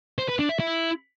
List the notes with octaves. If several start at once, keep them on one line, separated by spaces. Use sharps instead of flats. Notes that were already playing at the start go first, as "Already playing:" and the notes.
C5
B4
D4
E5
E4